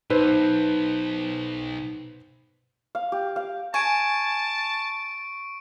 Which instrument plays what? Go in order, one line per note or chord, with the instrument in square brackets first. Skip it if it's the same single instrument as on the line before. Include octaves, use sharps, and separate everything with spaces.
[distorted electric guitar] B1 [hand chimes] D#4 [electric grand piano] B4 C5
[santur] F5
G4
F5
[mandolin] G#5 [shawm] A5 [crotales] C#6 D7